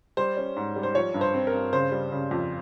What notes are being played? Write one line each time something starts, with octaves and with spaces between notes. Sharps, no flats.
G3 C5
C#4
G#2
G3
C5
F3 C#5
G2
C5
C4
A#4
G2
C#3 C5
G3
C#3
F2